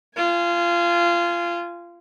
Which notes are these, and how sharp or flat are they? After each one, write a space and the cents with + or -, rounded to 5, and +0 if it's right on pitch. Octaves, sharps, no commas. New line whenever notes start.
F4 -20 G#5 +0